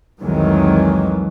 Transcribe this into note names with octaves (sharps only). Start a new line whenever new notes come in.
C2 F2 D#3 E3 F#3 G#3